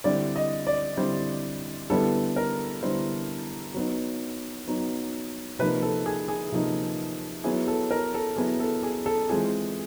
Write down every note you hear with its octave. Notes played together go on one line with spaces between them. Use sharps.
D3 G3 C4 E4 D5
D#5
D5
D3 G3 C4 E4 C5
D3 G3 B3 E4 A4
A#4
D3 G3 B3 E4 C5
F#3 B3 D#4
F#3 B3 D#4
C3 F3 A#3 D#4 B4
A4
G#4
G#4
C3 F3 A#3 D#4
F#3 B3 E4 G#4
A4
A#4
A4
F#3 B3 E4 G#4
A4
G#4
A4
E3 G#3 C4 F4 G#4